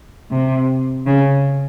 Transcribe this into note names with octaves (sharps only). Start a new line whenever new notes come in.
C3
C#3